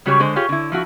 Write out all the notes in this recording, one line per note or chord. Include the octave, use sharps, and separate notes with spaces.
C#3 G3 G#3 F#4 G4 C#5
D3 G#3 C5
F4 G4 G#4 C#5
D3 E4
F3 E4 F#4